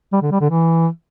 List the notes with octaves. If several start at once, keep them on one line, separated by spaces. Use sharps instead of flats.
G3
D3
G3
D3
E3